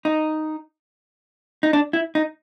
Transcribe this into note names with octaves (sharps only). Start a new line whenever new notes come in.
D#4
D#4
D4
E4
D#4